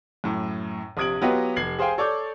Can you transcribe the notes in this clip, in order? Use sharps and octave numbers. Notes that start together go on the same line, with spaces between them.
F#2 A2
A#1 C3 D#6 G#6 D7 F#7
F#3 B3 F4 G4 B4 D#5
F1 G#6 C7 F#7
G#4 C5 F5 G5 G#5
A4 C#5 D5 C#6 D6 G6